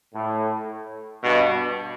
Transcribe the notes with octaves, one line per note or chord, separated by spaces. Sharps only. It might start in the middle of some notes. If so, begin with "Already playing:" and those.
A2
G2 B2